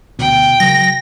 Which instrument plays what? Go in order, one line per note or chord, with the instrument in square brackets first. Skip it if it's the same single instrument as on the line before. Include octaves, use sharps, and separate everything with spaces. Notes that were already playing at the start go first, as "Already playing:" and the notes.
[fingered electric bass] D2 B2 [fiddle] G5
[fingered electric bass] C#3 F#3 [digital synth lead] A#6